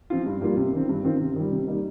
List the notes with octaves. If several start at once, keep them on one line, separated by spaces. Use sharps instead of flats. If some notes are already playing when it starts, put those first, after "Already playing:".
F3 C4 F4
G2
G3 A#3 F4
C3
D#3 C4
G2
D#3 C4 F4
C3
D#3 G3
C3
G3 A#3 D#4